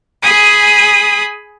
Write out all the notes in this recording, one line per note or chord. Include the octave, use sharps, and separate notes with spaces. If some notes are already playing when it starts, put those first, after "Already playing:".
G#4 G#5 B5 D#6